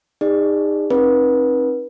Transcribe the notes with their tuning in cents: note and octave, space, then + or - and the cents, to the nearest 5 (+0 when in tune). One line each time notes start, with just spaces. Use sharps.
D#4 -5 G#4 -40 D5 +20
C4 +35 D#4 +0 B4 -30